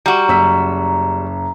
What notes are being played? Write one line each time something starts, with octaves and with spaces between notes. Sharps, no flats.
G3 F#4 A#5
F#1 E6 B6